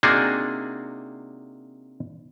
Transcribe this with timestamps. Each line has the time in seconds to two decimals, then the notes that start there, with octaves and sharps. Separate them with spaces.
0.03 C3 A#3 D4 D#4 F#4 G#4